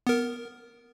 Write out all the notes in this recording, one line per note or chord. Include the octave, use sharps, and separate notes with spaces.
B3 A#4